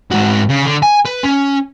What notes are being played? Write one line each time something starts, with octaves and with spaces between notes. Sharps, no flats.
G#2 F#4
C#3
D3
G#5
B4
C#4